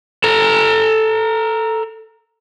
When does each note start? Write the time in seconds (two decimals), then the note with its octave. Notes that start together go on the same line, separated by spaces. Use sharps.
0.24 A4 A#5